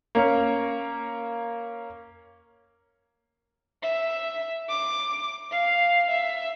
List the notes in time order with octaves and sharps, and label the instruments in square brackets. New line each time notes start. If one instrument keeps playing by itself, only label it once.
[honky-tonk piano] A#3 C#4
[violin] E5
D6
F5
E5